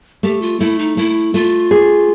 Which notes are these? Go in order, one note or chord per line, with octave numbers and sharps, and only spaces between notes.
A3 G4
F4
A3 E4
D#4
A3 E4
A3 F4
G#4